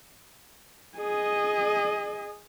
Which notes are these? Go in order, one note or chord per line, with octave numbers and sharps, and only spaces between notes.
G#4 D#5